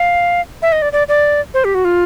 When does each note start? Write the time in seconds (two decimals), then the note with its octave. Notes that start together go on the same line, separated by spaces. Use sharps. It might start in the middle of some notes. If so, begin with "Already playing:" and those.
Already playing: F5
0.62 E5
0.72 D#5
0.82 D5
0.93 D5
1.09 D5
1.54 C5
1.65 G4
1.75 F#4
1.85 F4